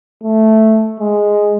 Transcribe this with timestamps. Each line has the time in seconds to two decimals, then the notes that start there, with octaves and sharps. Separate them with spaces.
0.23 A3
1.00 G#3